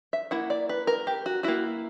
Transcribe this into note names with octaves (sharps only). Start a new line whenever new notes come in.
E5
A#3 E4 F#5
D5
B4
A#4
G4
F#4
A#3 E4 F#4